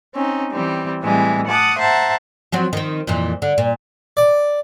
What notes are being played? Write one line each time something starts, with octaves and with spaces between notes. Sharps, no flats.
C4 C#4 D#4
E3 G3 C4
A2 E3 G3 G#3 C4
F#5 A5 D6 D#6 F#6
C5 E5 F#5 A5 A#5
F3 F#3 C4
D#3 C4
F2 A#2 E3
D3
A#2
D5